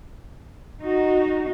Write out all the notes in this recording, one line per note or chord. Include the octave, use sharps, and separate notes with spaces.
D#4 F#4